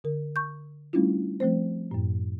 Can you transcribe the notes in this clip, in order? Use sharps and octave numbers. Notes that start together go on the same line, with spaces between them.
D3 A#4
C#6 G6
G3 A3 C#4 D4 E4 F4
F3 A3 C4 C5
F#2 A2